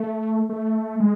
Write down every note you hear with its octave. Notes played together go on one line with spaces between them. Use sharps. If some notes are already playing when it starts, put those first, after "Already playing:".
Already playing: A3
A3
G#3